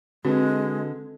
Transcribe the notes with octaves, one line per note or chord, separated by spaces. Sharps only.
D3 G#3 C4 F#4 B4